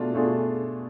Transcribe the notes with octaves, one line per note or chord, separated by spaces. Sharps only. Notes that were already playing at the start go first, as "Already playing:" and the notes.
Already playing: B2 A3 D4 F4 G#4
B2 A3 D4 F4 G#4